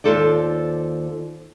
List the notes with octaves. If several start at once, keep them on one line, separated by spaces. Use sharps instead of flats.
D#2 G#2 F4 A4 C5 D5